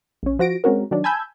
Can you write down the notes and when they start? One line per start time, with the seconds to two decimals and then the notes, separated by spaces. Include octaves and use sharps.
0.23 A#1 C#4
0.39 F3 F#4 A#6 D7
0.64 G#3 C4 C#4 F#4 A#4
0.91 D#3 F#3 D4
1.04 G#5 A5 B5 E6 G6 G#6